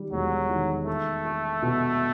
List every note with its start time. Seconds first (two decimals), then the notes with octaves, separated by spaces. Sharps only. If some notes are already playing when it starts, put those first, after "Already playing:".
Already playing: D#3 G3
0.12 E1 F#3
0.50 D#3
0.87 A3 A4
1.25 A4
1.62 B2